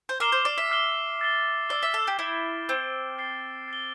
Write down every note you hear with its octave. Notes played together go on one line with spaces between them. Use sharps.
C5
A#4 D6 F6 C7 E7 G7
C5
D5
E5
D6 F6 C7 E7 G7
E6 A6 C7 G7
D5 E6 A6 C7 G7
E5
A4
G4
E4 E6 G6 D7 G7
C4 E6 G6 D7 G7
A6 C7 G7
A6 C7 G7